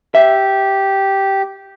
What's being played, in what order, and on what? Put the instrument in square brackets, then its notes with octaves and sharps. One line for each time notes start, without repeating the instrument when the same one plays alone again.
[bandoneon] G4 [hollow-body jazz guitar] E5